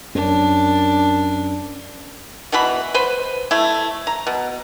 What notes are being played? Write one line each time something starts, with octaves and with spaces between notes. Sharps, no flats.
F#2 D4
B2 E3 F#4 B5
B4 C5
A3 E4
A#5
B2